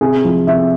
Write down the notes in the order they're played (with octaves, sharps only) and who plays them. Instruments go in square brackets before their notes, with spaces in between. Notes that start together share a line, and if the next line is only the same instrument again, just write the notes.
[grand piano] C3 G#4
F3
C3 E5